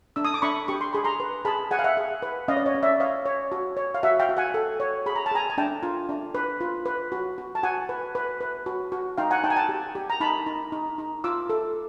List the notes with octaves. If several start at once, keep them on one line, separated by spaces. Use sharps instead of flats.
D4 E6
D#6
D6
D4 B5 C#6
G4 C#6
C6
G#4 B5
A#5 C6
B4
G#4 A5 B5
G#4 F#5 G#5
F5
E5 F#5
G#4
B4
C#4 D#5 F5
D5
C#5 D#5
C#4
D5 E5
C#5 D#5 F5
C#5
F#4
C#5
F5
F#4 E5 F#5
F5 G5
F#4
F#5 G#5
A4
C#5
G#4 B5
A#5
A5
G#4 G#5 A#5
G#5
D4 G5 A5
F4
D4
B4
F4
B4
F#4
F#4
A5
F#4 F#5 G#5
B4
B4
B4
F#4
F#4
D#4 F5 G5
F#5 G#5
D#4 G5 A5
G#5
G5 A5
G4
G4
A#5
D#4 A5 B5
D#4
D#4
D#4
F4 D6 E6
A4